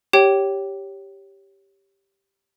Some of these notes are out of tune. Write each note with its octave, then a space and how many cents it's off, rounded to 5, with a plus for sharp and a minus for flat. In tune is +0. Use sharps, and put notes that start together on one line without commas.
G4 +0 C#5 +0 G5 -20